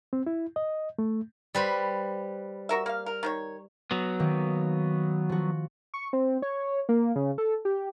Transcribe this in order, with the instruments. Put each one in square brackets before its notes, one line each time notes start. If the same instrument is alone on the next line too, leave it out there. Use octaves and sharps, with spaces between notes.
[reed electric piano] C4
E4
D#5
A3
[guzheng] G3 B4 C5
[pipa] F#4 A#4 E5
A#3 F5
A#4
D#3 E4 C#5
[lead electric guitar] F#3 B3
[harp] D#3 A#3
F3 F#4
[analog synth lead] C#6
C4
C#5
A#3
C#3
A4
G4